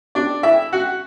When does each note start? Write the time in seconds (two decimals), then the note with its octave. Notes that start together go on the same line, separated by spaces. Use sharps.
0.15 D4 D5
0.43 E4 E5
0.73 F#4 F#5